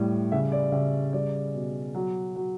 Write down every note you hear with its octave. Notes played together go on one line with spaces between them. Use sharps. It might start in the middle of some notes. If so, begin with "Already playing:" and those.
Already playing: A2 G3
C#3 E5
D5
C#3 E5
G3 D5
B2
F#3
F#3